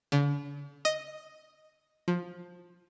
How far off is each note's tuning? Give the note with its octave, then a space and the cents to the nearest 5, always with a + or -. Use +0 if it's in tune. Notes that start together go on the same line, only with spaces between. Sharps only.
D3 -45
D#5 +0
F3 +15